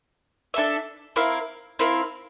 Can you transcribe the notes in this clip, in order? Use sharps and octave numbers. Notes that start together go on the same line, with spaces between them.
D4 A4 E5
C4 E4 A#4 F5
C4 E4 A#4 F5